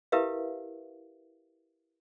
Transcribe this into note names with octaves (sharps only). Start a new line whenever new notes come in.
E4 G4 A#4 B4 E5 F5